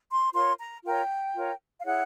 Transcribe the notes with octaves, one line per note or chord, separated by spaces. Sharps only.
C6
F4 A#4 C#5 C6
A#5
F4 A#4 C#5 G5
F4 A#4 C#5
F5
E4 G#4 C#5 F#5